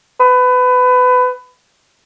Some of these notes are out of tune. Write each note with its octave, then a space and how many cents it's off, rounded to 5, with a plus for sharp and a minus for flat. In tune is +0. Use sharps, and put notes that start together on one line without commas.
B4 +25